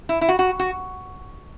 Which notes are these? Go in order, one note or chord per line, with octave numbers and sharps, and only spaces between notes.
E4
E4
F#4
F#4
F#4